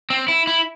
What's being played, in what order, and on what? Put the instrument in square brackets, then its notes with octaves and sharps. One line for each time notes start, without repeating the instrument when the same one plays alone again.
[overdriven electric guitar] C4
E4
E4